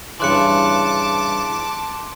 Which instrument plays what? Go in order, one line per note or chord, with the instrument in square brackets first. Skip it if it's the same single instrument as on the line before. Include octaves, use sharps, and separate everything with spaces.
[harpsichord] G2 C#3 E3 [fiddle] A5 [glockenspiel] C6 F#6 C#7 [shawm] D6